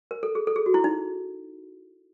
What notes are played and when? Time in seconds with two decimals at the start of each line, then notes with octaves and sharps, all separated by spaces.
0.11 A#4
0.23 A4
0.35 G#4
0.47 A4
0.56 G#4
0.66 F#4
0.74 E4
0.84 D#4